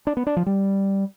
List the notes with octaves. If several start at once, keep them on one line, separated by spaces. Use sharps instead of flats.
D4
B3
D4
F3
G3